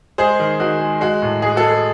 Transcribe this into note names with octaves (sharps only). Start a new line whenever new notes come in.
G#3 G#4 C5
D#3
D#3 F#4
G#3
G#3 F#4
A2
G#3 G#4
F#4 A4
G#3